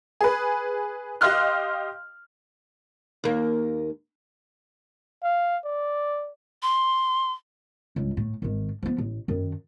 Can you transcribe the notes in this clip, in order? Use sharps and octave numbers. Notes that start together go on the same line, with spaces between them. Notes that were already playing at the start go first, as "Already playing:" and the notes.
G#4 B4
G4 D#5 F5 C6 F6 F#6
D#2 A#3
F5
D5
C6
C#2 G2
A2
G#1 D#3
F3 B3
A1
F#2 D#3